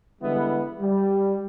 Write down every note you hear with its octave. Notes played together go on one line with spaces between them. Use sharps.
D3 E3 G3 G#3 B3 E4
G3